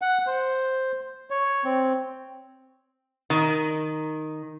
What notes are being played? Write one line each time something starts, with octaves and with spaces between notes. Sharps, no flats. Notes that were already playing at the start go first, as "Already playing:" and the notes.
F#5
C5
C#5
C4
D#3